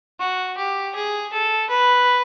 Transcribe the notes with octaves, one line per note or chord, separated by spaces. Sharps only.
F#4
G4
G#4
A4
B4